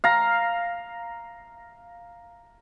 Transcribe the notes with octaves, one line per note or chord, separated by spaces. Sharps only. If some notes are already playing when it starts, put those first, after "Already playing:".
F5 A#5